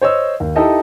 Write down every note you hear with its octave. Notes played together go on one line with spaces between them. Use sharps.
C5 C#5 D#5 E6
D#2
D#4 E4 G4 A4 D#5 E5